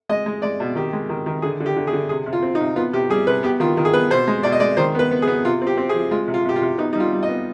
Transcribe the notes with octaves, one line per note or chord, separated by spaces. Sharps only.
G#3 D#5
G#3
G#3 D5
B2
D#3 G4
G#3
D#3
D#3
D3 G#4
D3
G4
D3
G#4
D3
C3 G#4
C3
F4
C4
D#4
C3
B3 F4
C3 G4
G3 G#4
C3 B4
B3 G4
D#3 F4
D#3
G#4
B3 B4
B2 C5
G#3
B2 D5
D#5
G#3 D5
D#3 C5
B3 B4
B3
G#4
B3
C3 F4
C4
G4
C4
G#4
F3
G#3 F4
C3
F4
C3 G4
F4
C3
B3 D#4
D#4
G3 F4
G3
D#5
B3